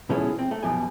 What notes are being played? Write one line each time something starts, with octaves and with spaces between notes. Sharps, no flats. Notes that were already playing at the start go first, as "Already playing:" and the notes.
B2 F3 G#3 C#4 E4 A4
C4
A3
F#2 B2 F3 G4 G#5